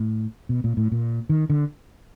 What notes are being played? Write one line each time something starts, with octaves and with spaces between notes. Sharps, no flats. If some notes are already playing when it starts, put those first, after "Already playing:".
Already playing: A2
B2
A#2
A2
A#2
D#3
D3